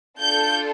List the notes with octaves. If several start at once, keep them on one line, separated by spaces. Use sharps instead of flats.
D4 F4 A4 G6